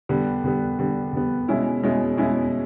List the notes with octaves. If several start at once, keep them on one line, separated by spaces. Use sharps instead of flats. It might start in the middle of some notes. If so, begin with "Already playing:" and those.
D3 G3 B3
D3 G3 B3
D3 G3 B3
D3 G3 B3
B2 G#3 C#4 E4
B2 G#3 C#4 E4
B2 G#3 C#4 E4